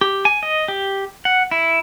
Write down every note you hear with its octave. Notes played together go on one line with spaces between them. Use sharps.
G4
G#5
D#5
G4
F#5
E4